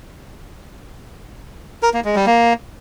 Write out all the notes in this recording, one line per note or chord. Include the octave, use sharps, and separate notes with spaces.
A#4
A#3
G#3
G3
A#3